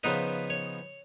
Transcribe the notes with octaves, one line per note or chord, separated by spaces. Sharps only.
C#3 F3 B3 D#4 B4
C#5